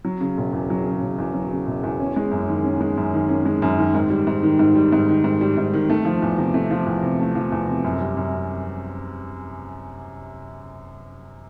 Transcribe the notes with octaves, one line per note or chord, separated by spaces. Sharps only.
F#3
C#3
E1
E2
F#3
C#3
E1
E2
F#3
C#3
E1
E2
C#4
G#3
F#2
D#3
C#4
G#3
F#2
D#3
C#4
G#3
F#2
D#3
G#2
G3
G#2
D#3
G#2
G3
G#2
D#3
G#2
G3
G#2
D#3
A3
F3
E2
C3
A3
F3
E2
C3
A3
F3
E2
C3
F#2
G3
F#2